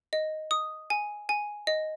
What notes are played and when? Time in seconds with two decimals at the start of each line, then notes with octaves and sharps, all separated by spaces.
0.13 D#5
0.51 D#6
0.90 G#5
1.29 G#5
1.67 D#5